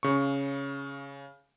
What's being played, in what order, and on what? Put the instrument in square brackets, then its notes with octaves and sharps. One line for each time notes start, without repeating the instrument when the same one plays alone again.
[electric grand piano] C#3 C#6